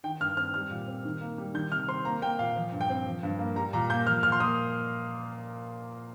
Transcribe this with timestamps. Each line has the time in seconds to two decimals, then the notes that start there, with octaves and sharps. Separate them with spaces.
0.04 D#3 G5
0.20 G2 F6
0.37 C4 F6
0.54 G3 F6
0.70 A#2
0.87 C4
1.05 D#3
1.21 A#3
1.38 G3
1.54 D#3 G6
1.71 C3 F6
1.88 C4 C6
2.05 A#3 A#5
2.22 A#3 G5
2.39 A#2 F5
2.56 F3
2.72 G2
2.81 G5
2.90 C4
3.06 F3
3.23 G2
3.39 A#3
3.56 G3 A#5
3.73 A#2 A#5
3.90 A#3 G6
4.06 F3 F6
4.23 A#2 F6
4.32 C6
4.40 A#3 D#6